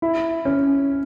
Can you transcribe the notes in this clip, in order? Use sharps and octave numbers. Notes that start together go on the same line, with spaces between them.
E4
C#4